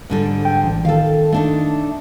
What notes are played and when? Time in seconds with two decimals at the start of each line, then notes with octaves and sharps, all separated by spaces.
0.10 G#2 D3 G3
0.45 G5
0.64 A1
0.85 D#3 A4 F5
1.32 A3 D4 D#4